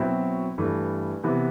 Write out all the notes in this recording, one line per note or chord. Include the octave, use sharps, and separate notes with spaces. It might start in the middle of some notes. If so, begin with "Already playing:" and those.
Already playing: B2 F#3 C4 E4
G2 E3 A3
C3 E3 B3 E4